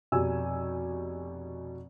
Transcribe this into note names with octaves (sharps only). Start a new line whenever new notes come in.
F1 B2 G4 G#5 E6